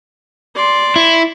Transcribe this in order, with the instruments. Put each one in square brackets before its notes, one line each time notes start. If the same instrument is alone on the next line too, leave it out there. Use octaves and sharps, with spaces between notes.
[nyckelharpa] D5 C6
[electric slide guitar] E4